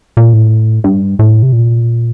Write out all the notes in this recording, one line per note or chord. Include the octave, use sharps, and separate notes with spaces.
A#2
A2
G2
A2
C3
A#2